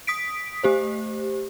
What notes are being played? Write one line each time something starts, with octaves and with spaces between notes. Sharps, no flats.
D#6 B6 D7
A3 G4 C5